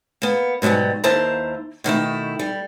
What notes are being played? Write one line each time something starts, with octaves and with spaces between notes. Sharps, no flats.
A#3 B3
G#2 B2 E3 F#3 G3
D#2 A#3 E4 C5 A5 A#5
B2 D#3 A3 E4
G3